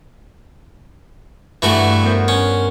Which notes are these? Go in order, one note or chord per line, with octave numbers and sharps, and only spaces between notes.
G2 E3 A3 F#4
B3 A#4 C5
C#4